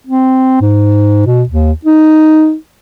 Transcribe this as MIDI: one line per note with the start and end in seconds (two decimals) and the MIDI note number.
0.07 0.57 60
0.61 1.23 44
1.26 1.43 47
1.49 1.72 39
1.85 2.55 63